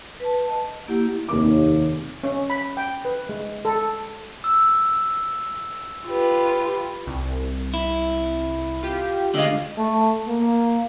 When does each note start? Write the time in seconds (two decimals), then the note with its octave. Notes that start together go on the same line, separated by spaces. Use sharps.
0.20 B4 A5
0.50 D#5
0.88 A#3 E4 G4 F#5
1.29 F1 D#2 A#3 D6
2.24 C#4
2.50 B5
2.77 G5
3.05 B4
3.29 G#3
3.65 A4
4.44 E6
6.05 F4 G4 B4
7.06 C2
7.74 E4
8.82 F4 G4
9.34 D3 G#3 D5 D#5 F5
9.77 A3
10.28 A#3